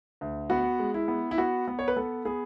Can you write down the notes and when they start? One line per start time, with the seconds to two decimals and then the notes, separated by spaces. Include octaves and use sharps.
0.21 D2
0.50 B3 F#4
0.79 G#3
0.94 E4
1.08 B3
1.31 E4
1.38 B3 F#4
1.68 B3
1.79 C#5
1.88 B4
1.96 B3 A4
2.25 B3 G#4